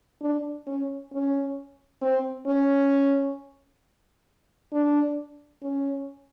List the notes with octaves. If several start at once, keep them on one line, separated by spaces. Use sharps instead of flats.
D4
C#4
C#4
C4
C#4
D4
C#4